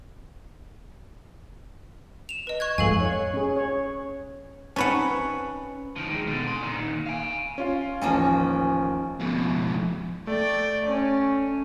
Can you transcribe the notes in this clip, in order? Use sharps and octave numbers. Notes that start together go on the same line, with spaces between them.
E7 F7
B4 D#5
C#6 F#6 G#6
F2 G#2 A4 F5 G#5
C#5
C#4 G#4
C#5
C4 C#4 D#4 B4 F#5 A5
D#3 F3
D#3 G#3
B2 D3
G#5 C6
A#2 D#3
F5 G#5
C#4 F4 F5
A1 D#2 F3 A#3 C#4
F2 B2
A3 D5 G5
C#4